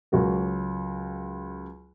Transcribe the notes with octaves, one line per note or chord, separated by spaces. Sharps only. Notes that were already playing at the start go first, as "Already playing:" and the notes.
C#2 F#3 F#4 A#4